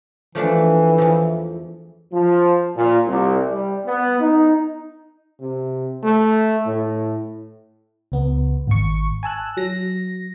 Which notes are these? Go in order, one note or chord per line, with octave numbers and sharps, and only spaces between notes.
E3 F3 A3 D4
E2 F3
F3
A#2
C2
G3
B3
D#4
C3
A3
A2
C#2 B3
G#1 C#6
G#5 A5 E6 F#6
F#3 A#6